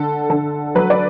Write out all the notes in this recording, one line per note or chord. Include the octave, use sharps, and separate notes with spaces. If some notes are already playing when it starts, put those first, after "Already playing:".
Already playing: D3 A4
D3 A4
F#3 B4
D5